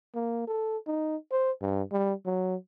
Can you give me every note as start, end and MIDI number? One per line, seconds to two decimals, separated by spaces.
0.15 0.46 58
0.48 0.77 69
0.87 1.16 63
1.32 1.51 72
1.61 1.83 43
1.92 2.13 55
2.26 2.55 54